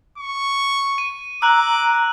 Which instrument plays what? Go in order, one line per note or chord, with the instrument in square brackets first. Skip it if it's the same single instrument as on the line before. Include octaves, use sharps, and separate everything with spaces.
[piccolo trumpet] C#6
[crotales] D#7
[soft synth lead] A#5 [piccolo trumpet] D6 [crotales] E6 F#6 F#7